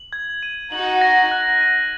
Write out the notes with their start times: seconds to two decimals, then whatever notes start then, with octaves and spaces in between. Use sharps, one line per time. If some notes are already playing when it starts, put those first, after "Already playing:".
Already playing: F#7
0.13 G#6
0.43 D#7
0.72 D#4 F#4 F#7
1.01 A#6
1.31 F#6
1.61 D#7